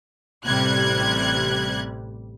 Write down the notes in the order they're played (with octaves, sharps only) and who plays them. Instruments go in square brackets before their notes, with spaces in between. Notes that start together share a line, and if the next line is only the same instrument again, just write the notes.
[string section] A1 C3 G3 F#6 G#6